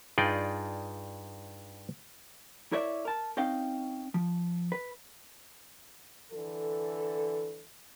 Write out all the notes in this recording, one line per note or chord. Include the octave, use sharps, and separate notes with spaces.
G2 D#4 F4 G#4 D5 G5
E4 A#4 C#5 D5 E5
A#4 A5
C4 C#4 D#4 D#5 F5 G5
F3
B4
D3 E3 A4